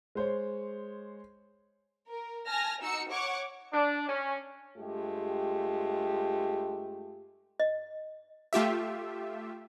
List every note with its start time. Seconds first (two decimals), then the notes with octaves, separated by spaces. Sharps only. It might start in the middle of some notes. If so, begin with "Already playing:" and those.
0.15 G#3 C5 C#5
2.07 A#4
2.48 G#5 A5 F6 A#6
2.81 D#4 F#4 E6 C#7
3.10 C#5 F#5 C#6 D6
3.73 D4
4.08 C#4
4.77 G2 G#3 A3 F4 G4
7.60 D#5
8.53 A3 F4 G4 E5